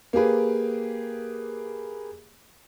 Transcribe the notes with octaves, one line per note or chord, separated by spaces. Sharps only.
A#3 G4 G#4 B4